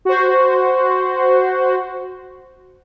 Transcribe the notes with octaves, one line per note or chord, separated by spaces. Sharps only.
F#4 C5